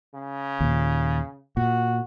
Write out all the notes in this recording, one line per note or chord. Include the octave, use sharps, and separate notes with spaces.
C#3
D#2 A#2
A#2 F#4